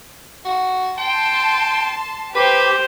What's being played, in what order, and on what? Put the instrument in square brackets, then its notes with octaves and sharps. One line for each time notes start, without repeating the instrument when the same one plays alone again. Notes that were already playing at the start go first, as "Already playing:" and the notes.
[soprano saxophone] F#4
[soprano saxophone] G5 [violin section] A5 C6
[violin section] G4 [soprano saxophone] B4 [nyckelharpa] C5 [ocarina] D6